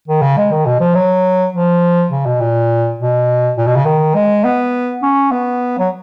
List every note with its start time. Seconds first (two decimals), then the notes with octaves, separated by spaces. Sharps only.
0.08 D#3
0.22 C#3
0.37 G#3
0.51 D#3
0.66 B2
0.80 F3
0.95 F#3
1.53 F3
2.11 C#3
2.26 B2
2.40 A#2
2.99 B2
3.57 A#2
3.66 B2
3.76 C#3
3.85 D#3
4.15 G#3
4.44 B3
5.02 C#4
5.31 B3
5.79 F#3